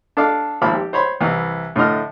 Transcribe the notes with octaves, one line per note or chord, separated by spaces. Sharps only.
D4 A4 D5 F5 D6
G#1 F3 A#3 B5 D6
G4
C5 C#5 B5 C6
C2 E3
A2 D3 A3 D#5 F6